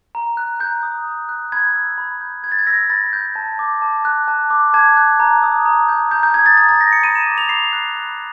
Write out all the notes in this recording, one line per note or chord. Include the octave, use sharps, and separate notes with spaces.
A#5
F#6
A#5 G6
D#6
A#5
F#6
B5 G#6
E6
B5
G6
B5 G#6
A6
G#6
E6 A#6
B5 A6
G6
A5
D6
A5
F#6
A5
D6
A5 G#6
F#6
A#5
D#6
A#5
G6
A#5 G6
G6
D#6 G#6
A6
A#5 A6
A6
G6 A#6
C#7
B5 D#7
E7
D6
F7
B5 C7
F#6
B5